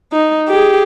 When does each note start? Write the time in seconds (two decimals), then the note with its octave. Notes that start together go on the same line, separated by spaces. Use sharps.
0.13 D#4
0.49 G4 G#4